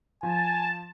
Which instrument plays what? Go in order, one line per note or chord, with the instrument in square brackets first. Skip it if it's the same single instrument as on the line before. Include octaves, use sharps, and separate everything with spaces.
[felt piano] F3 [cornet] G#5 [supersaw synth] A5